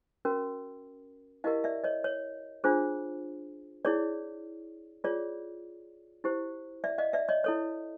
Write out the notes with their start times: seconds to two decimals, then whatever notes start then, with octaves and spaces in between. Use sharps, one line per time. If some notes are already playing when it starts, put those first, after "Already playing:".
0.25 C#4 F#4 A#4
1.44 E4 G4 A#4 D#5 F5
1.64 D5 E5
1.84 C#5 D#5
2.04 C#5
2.64 D4 F4 G#4 C5
3.85 E4 G#4 C#5 D5
5.04 F4 G#4 C#5 D5
6.24 E4 G4 C5
6.84 D5 E5
6.98 D#5 F5
7.13 D5 E5
7.29 C#5 D#5
7.44 E4 A4 C#5